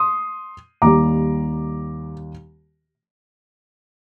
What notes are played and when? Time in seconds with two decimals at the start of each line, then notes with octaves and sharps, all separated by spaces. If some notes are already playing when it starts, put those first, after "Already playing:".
Already playing: C6 D#6
0.82 D#2 D#3 G3 A#5 D6